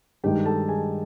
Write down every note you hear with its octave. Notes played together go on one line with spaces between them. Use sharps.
G2 D#3 G#3 G4 G5
A4 A5
G#4 G#5